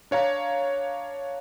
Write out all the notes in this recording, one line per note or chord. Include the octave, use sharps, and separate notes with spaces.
D4 C#5 F5 A#5